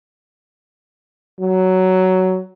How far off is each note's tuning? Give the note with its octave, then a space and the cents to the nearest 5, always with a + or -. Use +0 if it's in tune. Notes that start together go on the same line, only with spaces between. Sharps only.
F#3 +10